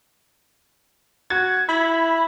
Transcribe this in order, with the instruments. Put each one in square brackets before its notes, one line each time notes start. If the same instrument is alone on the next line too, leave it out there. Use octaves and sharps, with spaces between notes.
[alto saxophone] F#4 [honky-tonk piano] G#6
[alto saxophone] E4 [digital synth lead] B5